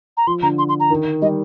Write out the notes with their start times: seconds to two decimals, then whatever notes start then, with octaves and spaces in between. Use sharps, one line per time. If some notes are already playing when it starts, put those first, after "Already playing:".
0.17 A#5
0.27 F3 C6
0.43 D3 A#5
0.58 C6
0.69 C6
0.80 A#5
0.90 D#3
1.22 G3 D#5